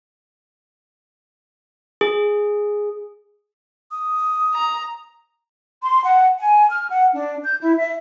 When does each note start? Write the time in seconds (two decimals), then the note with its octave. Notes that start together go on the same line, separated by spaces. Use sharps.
2.01 G#4
3.91 D#6
4.54 A#5
5.82 C6
6.04 F#5
6.39 G#5
6.70 F6
6.90 F#5
7.14 D4
7.44 G6
7.60 E4
7.79 E5